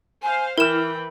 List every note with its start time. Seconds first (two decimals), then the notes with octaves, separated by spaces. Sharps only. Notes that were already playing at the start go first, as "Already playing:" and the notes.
0.22 C5 F5 G#5
0.58 E3 E4 A#4 G5 B5 F6 E7